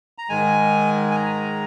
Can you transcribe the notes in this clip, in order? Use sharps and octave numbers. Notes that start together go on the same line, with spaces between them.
A#5
G#2 D#3 G#3 G#5
G#5
A#5